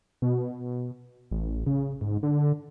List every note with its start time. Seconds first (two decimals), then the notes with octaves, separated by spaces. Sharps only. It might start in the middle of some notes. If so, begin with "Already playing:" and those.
0.22 B2
1.31 A1
1.66 C#3
2.01 G#2
2.23 D3